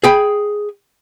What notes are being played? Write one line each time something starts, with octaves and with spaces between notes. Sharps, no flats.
G#4 G5 B5